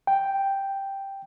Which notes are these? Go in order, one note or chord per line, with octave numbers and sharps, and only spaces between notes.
G5